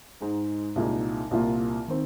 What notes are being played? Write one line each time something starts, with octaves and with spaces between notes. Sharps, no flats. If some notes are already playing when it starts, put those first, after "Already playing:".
G#2 G#3 D#4
C2 A#2 G#3 D#4
C2 A#2 A#3 F4
D#3 C4